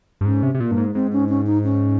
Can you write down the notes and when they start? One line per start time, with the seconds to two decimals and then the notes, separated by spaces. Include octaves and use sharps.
0.21 G2
0.25 G#2 C#4
0.43 C3
0.55 C3
0.60 A#2 A#3
0.71 G2
0.78 G#2
0.95 G#2 C4
1.12 C#4
1.29 C#4
1.46 D#4
1.64 C#4